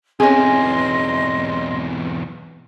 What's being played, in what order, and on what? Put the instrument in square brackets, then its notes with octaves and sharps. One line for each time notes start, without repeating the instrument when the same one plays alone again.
[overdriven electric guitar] B1 E2 [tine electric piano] C4 [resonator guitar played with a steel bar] C#4 G#4 [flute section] D#5 C6